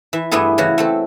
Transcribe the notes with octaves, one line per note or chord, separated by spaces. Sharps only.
E3 E5
G2 A3 B3 E4 G#4 A4
C#3 E3 F#4
A3 C4 A4